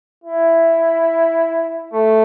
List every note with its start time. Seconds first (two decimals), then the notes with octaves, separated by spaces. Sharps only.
0.24 E4
1.93 A3